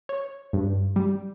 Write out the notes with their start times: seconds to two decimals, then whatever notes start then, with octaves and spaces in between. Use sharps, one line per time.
0.09 C#5
0.53 G2
0.96 G3